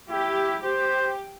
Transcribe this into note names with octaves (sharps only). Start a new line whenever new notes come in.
E4 G4
G4 C5